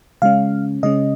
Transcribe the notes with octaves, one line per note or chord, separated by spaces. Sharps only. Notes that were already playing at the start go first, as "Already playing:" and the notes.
C#3 G#3 C#4 F5
C#3 G#3 C#4 D#5